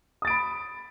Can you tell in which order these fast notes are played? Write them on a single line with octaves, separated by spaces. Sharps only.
D#6 A6 D7 B5